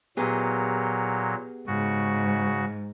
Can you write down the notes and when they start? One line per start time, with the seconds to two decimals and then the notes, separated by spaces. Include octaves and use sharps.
0.17 A#2 F#3 B3 G4 G#4
1.67 G#2 C#3 F#4